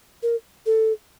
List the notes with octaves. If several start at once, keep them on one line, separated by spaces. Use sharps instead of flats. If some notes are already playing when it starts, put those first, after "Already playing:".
A#4
A4